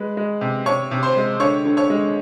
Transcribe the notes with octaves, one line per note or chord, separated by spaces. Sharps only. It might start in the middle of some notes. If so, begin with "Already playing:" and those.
Already playing: G#3 B4
G#3
C3
C3 C#5 C#6
C3
C5 C6
G#3
D3 C#5 C#6
D3
C#5 C#6
G#3